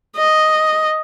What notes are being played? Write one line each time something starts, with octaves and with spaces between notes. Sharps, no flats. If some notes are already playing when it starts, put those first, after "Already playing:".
D#5